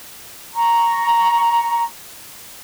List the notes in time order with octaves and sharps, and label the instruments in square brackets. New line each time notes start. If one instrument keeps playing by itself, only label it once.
[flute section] A#5 C#6